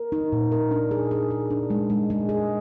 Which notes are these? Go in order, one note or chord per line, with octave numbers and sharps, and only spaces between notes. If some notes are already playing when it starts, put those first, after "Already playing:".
Already playing: A#4
D#4
A#2
A#4
D4
G#4
G#4
G#4
D4
G#3
G#3
G#3
G#4